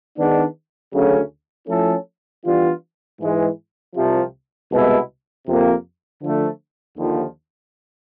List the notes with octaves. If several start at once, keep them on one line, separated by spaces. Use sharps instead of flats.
D#3 G#3 B3 D4
D2 C#3 F#3 A3 C#4
F3 A3 C#4 E4 A4
E3 G3 B3 D4 F4
G#2 E3 G#3
C2 C3 F3
C2 B2 G#3 B3 E4
F2 C3 F3 A#3
D3 F3 A3
D#2 D3 F3